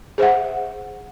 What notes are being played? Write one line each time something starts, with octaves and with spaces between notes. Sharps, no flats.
G#4 C5 E5 F#5